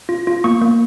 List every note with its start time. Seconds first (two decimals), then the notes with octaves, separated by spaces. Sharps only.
0.09 F4
0.27 F4
0.44 A#3 C#6
0.61 A#3